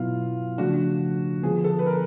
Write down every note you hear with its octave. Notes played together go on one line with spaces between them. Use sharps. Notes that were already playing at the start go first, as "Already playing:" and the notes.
Already playing: B2 F#3 B3 E4 F4
C#3 F3 A3 D4 F#4
D3 F3 G#3 B3 G#4
A4
B4
A#4